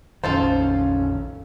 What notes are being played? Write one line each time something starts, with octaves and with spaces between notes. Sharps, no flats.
A#1 F2 D#3 C#4 F4 A4 C5